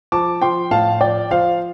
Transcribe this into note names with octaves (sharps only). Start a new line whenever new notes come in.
F3 A5 D6
F3 G5 C6
A2 F5 A5
F3 D5 G5
F3 C5 F5